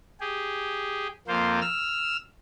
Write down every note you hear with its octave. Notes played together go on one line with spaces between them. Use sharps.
G4 G#4
F2 A#3 F4 C5
E6 F6